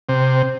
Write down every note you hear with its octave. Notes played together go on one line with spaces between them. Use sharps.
C3